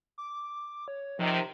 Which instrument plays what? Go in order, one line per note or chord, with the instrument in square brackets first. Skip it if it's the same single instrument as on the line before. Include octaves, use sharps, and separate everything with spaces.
[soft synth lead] D6
C#5
[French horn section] C3 D#3 [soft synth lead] F3